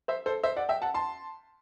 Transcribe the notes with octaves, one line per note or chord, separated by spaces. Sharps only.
C5 E5
A4 C5
C5 E5
D5 F#5
E5 G5
F#5 A5
A5 C6